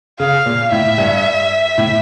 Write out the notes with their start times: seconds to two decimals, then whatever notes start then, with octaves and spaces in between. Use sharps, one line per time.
0.19 C#3 F5
0.46 A#2
0.72 A2 E5
0.98 G2
1.78 A2